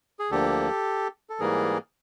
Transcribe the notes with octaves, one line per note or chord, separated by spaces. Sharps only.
G#4
D2 D3 F3 A#3 G4 A4
A4
G#2 E3 G3 A#3 G#4 A#4